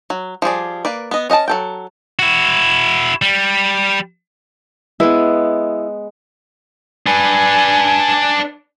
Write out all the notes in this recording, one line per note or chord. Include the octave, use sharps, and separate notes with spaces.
F#3
F3 G3 G#4 D5
A#3 B4 D5
B3 D#5
C#4 D#5 F#5 A5
F#3 A4 G5
E4 F#4
G3
G#3 B3 E4 B4
D4 B4 G#5